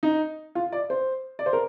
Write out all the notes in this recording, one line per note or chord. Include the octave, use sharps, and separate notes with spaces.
D#4
F4
D5
C5
D5
C5
A#4